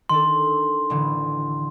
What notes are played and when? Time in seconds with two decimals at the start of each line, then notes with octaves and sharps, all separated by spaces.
0.09 D#3 D4 A4 C6
0.90 A1 D3 E3